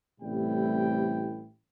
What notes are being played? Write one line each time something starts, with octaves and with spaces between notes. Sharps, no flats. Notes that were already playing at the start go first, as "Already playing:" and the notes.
A1 A2 C3 G3 E4 G5